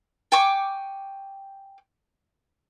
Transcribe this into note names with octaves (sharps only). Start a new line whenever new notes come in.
G5 G#5 C#6 D6